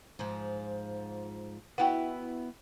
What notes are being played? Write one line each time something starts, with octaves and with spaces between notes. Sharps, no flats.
G#2 F3
B3 E4 F#4 F#5 G5